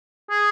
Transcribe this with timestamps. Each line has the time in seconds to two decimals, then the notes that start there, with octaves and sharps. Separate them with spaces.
0.30 G#4